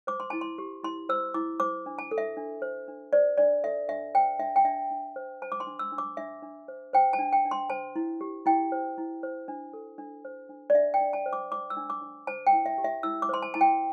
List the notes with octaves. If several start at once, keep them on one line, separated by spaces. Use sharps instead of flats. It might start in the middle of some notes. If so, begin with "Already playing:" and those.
C5 D6
C6
E4 A5
C6
G4
E4 C6
C5 E6
E4 D6
C5 D6
D4
A5
A4
E5
D4
C5
D4
C5 D5
D4 D5
A4 E5
D4 E5
C5 G5
D4 E5
G5
D4 E5
D4
C5
C5 A5
D6
C6
D4
E6
D4
D6
D4 E5
D4
C5
C5 G5
A5
D4
G5
D4
C6
C5 A5
E4
G4
E4 G5
C5
E4
C5
D4
A4
D4
C5
D4
D5
D4 E5
G5
D4
A5
C5
D6
C5 D6
E6
D4
D6
D4
C5 A5
G5
E4
E5
G4
E5
E4 E6
D6
C5 C6
A5
E4 A5
G5